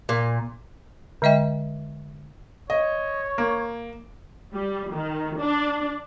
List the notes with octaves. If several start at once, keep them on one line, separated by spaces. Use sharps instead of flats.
A#2
D3 G#3 D#5 E5 G5
C#5 D#5
A#3
G3
D#3
D4